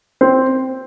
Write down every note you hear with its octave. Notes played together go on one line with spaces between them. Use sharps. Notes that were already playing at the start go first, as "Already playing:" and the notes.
C4